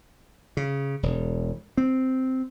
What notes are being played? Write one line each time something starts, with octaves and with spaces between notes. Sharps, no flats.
C#3
E1
C4